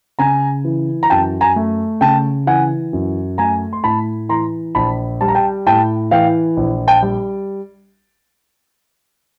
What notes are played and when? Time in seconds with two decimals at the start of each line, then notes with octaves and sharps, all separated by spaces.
0.19 C#3 G#5 A#5
0.64 E3
1.03 A#5
1.10 F#2 G5 A5
1.41 G#5 A#5
1.56 A3
2.01 C#3 G5 A5
2.47 E3 F#5 G#5
2.93 F#2
3.38 A3 G#5 A#5
3.73 C6
3.84 A2 A5 B5
4.29 E3 A#5 C6
4.75 A#1 A5 B5
5.21 G3 A5
5.28 A#5
5.35 G5 A5
5.66 A2 G5 A5
6.11 E3 F5 G5
6.57 A#1
6.88 G5 A5
7.02 G3